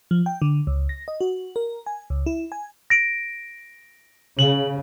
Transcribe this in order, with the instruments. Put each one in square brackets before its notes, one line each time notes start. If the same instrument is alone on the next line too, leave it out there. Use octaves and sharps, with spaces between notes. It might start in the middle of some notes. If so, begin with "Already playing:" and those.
[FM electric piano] F3
G5
D3
C#2
A#6
D#5
F#4
A#4
G#5
C#2
E4
G#5
[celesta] A#6 D7
[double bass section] C#3 [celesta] F#7